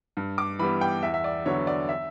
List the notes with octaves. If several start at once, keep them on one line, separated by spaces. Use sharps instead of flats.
G2
D6
E3 G3 B3 B5
G5
E2 E5
E5
D5
D3 F#3 B3 C#5
D5
E5